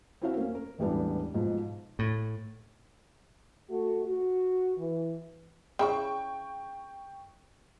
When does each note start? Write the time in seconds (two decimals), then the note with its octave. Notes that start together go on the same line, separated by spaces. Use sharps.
0.22 C4 C#4 E4 F#4 C5 F5
0.37 A#3 C#4
0.55 A#4
0.78 E1 A1 G3 B3 D4
1.34 G#2 B2 F3
1.99 A2
3.69 A3 F#4
4.04 F#4
4.77 E3
5.79 C#3 E4 G5 C#6